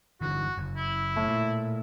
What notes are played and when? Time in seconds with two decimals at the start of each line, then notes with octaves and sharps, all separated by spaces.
0.21 G1 D3 E3 F#4
0.58 F#1
0.76 E4
1.16 A2
1.29 A#2